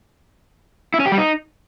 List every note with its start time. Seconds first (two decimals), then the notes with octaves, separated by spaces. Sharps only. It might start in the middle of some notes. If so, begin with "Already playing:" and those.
0.94 E4
1.00 C#4
1.06 G4
1.12 G3
1.18 D#4